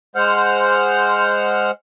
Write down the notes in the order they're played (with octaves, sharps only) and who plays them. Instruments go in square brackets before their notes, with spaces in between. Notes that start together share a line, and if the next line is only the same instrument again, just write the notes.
[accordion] G#3 C5 F#5 F6